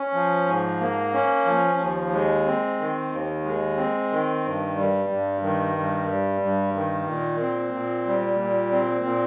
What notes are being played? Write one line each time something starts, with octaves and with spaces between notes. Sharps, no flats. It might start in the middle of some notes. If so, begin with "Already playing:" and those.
Already playing: C#4
F3
G#2
A#3
C#4
F3
D#2
G#3
C4
D#3
D#2
G#3
C4
D#3
G2
G3
G2
D#3
G2
G3
G2
D#3
A#2
C4
A#2
G3
A#2
C4
A#2